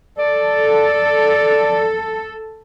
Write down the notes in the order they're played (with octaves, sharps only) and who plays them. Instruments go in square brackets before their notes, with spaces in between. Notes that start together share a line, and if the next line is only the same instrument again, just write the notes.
[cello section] A4 [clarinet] D5